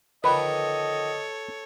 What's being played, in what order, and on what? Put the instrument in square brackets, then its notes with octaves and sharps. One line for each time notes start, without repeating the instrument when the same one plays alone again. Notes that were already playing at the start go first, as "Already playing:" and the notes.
[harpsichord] D3 D#3 F3 [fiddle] A4 C#5 [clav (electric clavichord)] B4 [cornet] D#5